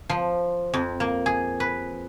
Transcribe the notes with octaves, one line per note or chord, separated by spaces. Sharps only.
F3
F2
A#3
G#4
B4